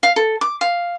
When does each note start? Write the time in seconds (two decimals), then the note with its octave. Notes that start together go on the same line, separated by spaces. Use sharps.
0.03 F5
0.16 A4
0.41 D6
0.61 F5